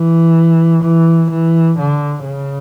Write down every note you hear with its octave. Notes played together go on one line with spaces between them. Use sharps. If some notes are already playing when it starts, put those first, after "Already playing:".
Already playing: E3
E3
E3
D3
C#3